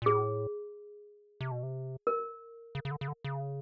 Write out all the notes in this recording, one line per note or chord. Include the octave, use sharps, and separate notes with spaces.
A#2
A2 G#4
C3
B2
C3
A#4
C#3
C#3
D3
C#3
D3
C#3